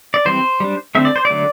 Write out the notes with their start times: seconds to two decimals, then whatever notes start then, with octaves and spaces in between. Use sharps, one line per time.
0.14 D5
0.25 E3 G3 C4 C5
0.60 G3 D4
0.95 D3 A3 C4 E5
1.05 D5
1.16 C5
1.25 D5
1.30 D3 F#3 A3